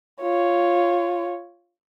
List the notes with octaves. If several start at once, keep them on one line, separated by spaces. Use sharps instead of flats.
F4 C#5